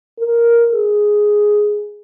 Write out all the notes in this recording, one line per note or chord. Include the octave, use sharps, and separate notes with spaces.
A#4
G#4